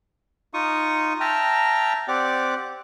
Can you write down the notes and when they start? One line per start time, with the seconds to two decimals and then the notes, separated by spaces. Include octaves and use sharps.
0.54 D#4 F4 C#6 D#6
1.20 E5 G5 A5 A#5 F6
2.08 C4 G4 D5 F#5 D6